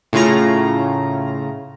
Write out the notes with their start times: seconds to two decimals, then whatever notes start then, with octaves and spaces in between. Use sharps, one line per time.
0.13 A2 C#3 F4 A#5